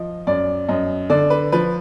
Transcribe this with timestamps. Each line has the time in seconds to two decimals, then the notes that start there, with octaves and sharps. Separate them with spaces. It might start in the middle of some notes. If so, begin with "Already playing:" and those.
Already playing: F3 D#5
0.27 F#2 D5
0.69 F#2 D#5
1.10 D3 D5
1.30 B4
1.52 F3 B4